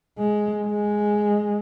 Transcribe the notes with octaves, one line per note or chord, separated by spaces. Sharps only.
G#3
G#3